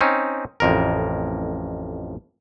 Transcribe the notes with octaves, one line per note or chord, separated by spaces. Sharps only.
C4 C#4 D#4
A1 F2 A#4